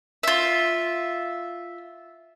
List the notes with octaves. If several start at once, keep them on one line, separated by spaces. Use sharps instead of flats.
F4 E5